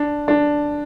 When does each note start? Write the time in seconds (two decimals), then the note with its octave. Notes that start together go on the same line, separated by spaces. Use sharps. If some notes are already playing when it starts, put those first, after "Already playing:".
Already playing: D4
0.28 D4